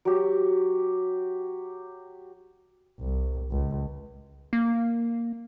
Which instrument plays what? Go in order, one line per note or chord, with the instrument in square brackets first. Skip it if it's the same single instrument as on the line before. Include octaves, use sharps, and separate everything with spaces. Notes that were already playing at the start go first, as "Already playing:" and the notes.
[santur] F#3 G4
[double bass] C2
C#2
[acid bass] A#3